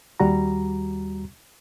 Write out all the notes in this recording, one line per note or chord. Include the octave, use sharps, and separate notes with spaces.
D#2 G3 F#4 A#5